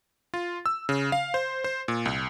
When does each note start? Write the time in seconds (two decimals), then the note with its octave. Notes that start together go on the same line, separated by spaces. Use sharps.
0.34 F4
0.66 E6
0.89 C#3
1.12 F5
1.34 C5
1.64 C5
1.88 A#2
2.05 C2